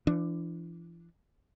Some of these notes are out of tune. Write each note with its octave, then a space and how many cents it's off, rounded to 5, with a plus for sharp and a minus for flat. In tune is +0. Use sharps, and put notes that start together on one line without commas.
E3 +40 D4 +0